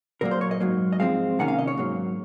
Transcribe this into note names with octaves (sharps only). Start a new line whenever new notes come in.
A#2 F#3 A#3 A#4
C5
C#5
D#5
G#2 F#3 A#3
D#5
G#2 F3 G#3 C4 F5
C3 D#3 A#3 C#4 F#5
F5
D#5
C#5
G#2 F#3 A#3